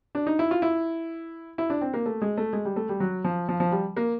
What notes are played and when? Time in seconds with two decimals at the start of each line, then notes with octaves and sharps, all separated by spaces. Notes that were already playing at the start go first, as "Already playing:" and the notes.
0.15 D4
0.27 D#4
0.39 E4
0.51 F4
0.62 E4
1.58 E4
1.70 D4
1.81 C4
1.94 A#3
2.06 A3
2.22 G#3
2.37 A3
2.53 G#3
2.65 G3
2.76 A3
2.89 G3
3.00 F#3
3.24 F3
3.49 F3
3.60 F3
3.72 G3
3.97 A#3